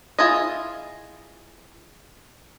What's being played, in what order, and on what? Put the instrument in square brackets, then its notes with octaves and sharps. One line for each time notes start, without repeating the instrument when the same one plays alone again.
[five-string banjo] E4 F4 G#4 D#5